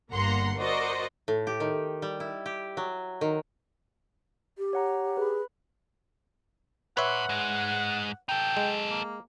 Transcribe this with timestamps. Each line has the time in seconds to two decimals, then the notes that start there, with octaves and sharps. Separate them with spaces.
0.12 G1 G2 A#3 F#5 A#5 C6
0.57 F#4 A#4 C5 D5 D#5 F#5
1.28 A2
1.47 G4
1.60 D#3
2.02 G3
2.20 E4
2.46 G4
2.77 F#3
3.21 D#3
4.58 G4
4.73 C#5 F#5 A#5
5.17 G#4 B4 B5
6.97 B4 C#5 E5 F#5 A#5 C6
7.29 G#2 G#3
8.29 D#4 A4 G5
8.57 G#3
8.90 A#3